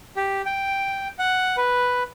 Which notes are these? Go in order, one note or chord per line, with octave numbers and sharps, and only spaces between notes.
G4
G5
F#5
B4